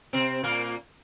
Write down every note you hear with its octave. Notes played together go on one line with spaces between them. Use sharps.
C3 C4
A#2 A#3